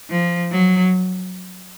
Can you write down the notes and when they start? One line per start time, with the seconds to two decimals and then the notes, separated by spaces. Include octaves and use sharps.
0.10 F3
0.51 F#3